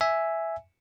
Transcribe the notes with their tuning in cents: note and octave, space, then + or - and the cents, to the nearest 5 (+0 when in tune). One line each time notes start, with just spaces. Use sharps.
E5 +0 G#5 +0